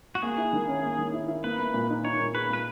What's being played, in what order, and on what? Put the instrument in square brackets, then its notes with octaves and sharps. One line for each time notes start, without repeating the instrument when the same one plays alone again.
[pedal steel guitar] F#4
[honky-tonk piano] A#3 [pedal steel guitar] G#4
[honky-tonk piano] E4
D#3
C#4
A#3
D#3
E4
E4
[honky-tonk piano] A#3 [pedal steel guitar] B4
[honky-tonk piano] A#3
A#2
D#4
[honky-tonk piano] D#4 [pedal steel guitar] C#5
[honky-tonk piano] A#2
[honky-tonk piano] G#4 [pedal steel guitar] B4
[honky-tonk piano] A#2 [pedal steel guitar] B4